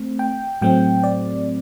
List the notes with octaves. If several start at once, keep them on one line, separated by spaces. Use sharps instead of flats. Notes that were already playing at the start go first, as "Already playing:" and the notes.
Already playing: A3 C4
G5
A2 F#3 A3 C4 G5
D5